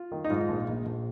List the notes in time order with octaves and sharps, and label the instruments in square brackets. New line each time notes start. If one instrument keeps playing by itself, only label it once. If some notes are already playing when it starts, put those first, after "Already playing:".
Already playing: [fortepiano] F4
D#3
D#4
G#2 F4
A#1
A#1
A#1